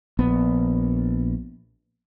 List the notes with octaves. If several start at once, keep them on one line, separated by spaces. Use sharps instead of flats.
A#1 B3